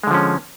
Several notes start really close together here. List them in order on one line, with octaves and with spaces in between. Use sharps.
G#3 D3 F3 C#4